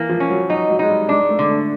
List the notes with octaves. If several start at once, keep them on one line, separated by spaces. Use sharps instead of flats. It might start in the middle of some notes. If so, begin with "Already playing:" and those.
Already playing: E3 A#3
F3
C#4
F#3
F#3 D#4
F#3
G#3 D#4
G3
G#3 D4
G#3
A3
D3
A3